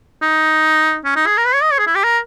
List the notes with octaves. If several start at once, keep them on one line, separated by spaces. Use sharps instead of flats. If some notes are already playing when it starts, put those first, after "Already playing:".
D#4
C#4
D#4
G#4
A#4
B4
C#5
D#5
C#5
G#4
E4
G4
A#4